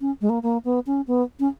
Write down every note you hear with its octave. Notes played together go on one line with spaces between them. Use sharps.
C#4
G#3
A#3
A#3
B3
C#4
B3
C#4